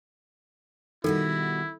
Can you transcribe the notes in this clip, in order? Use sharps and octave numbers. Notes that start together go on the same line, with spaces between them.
B2 D#3 G3 E4 F#4 A4